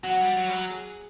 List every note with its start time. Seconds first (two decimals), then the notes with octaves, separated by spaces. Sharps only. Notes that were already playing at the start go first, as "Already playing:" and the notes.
0.03 F#3 F#4
0.20 G3
0.37 F#3
0.49 G3
0.53 F#3
0.70 G#4